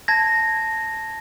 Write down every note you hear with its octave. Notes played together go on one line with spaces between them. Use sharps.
A5 G#6 A#6